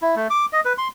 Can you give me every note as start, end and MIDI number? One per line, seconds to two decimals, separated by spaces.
0.02 0.15 64
0.16 0.27 57
0.30 0.46 86
0.53 0.61 75
0.65 0.73 71
0.78 0.88 84